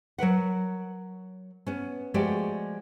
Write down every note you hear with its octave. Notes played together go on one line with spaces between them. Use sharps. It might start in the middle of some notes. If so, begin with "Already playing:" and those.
F#3 A#4 B4 F#5
B3 C#4
F3 G#3 A3 F#4 G4 D5